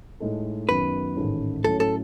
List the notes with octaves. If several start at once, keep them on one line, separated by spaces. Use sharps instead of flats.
A2 G#3 D#4 A4
F#2 D#3 F#3 B3 B4
A1 G#2 D#3 A3 C#4
A2 F#3 C#4 A4
A4